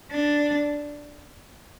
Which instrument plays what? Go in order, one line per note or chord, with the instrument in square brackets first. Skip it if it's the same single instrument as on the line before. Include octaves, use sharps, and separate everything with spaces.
[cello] D4